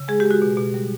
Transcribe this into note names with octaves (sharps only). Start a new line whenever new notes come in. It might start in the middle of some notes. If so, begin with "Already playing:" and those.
Already playing: C#3
G#3 G#4
G4
G#3
F#4
B2
B2
G3